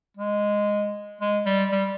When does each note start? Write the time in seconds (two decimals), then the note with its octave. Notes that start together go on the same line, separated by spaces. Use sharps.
0.17 G#3
1.21 G#3
1.45 G3
1.72 G3